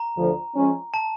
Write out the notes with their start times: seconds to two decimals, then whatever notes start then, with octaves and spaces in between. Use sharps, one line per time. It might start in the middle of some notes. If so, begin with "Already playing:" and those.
Already playing: A#5
0.16 D2 D3 F3
0.55 F3 G#3 C#4
0.94 A5